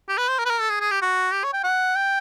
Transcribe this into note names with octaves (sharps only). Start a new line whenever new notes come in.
G4
B4
C5
A#4
B4
A#4
A4
G#4
G#4
G4
F#4
G4
C#5
G5
F#5
G5